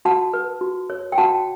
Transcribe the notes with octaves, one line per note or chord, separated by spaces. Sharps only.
F#4 F#5 A5
B4
F#4
C#5
G5
F#4 F#5 A5